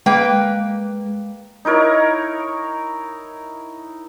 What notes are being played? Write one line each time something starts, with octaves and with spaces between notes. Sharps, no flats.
G#3 A#3 B4 G5
D#4 E4 A#4 C#5